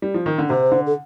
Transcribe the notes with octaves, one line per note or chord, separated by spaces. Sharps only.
G3
F3
D#3
D3
C3 C5
D3
A4